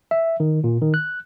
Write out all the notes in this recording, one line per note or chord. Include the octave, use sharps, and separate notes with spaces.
E5
D#3
A#2
D#3
F#6